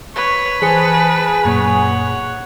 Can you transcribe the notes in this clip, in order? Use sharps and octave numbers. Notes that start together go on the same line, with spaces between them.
B4 C#5
E3 G#4 C5 A5 C#7
F#2 A#2 C#5 F#5